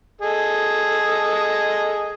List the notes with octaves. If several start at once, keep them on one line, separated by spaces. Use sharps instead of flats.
G#4 A4 D#5